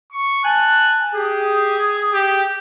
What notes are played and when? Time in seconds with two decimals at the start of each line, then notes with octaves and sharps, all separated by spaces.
0.12 C#6
0.44 G#5 A5 F#6
1.14 G4 G#4 D#6
1.80 G#6
2.13 G4